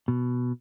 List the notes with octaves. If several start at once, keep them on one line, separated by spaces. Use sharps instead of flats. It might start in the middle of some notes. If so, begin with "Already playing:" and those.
B2